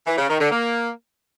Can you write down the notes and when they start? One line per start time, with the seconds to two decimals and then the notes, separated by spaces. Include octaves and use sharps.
0.06 E3
0.18 C#3
0.29 D#3
0.40 D3
0.51 A#3